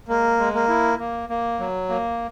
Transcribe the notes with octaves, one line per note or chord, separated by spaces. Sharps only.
G#3 A#3
G#3
A#3
E4
A#3
A#3
F#3
A#3